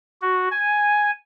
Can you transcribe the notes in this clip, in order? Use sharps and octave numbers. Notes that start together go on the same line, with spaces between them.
F#4
G#5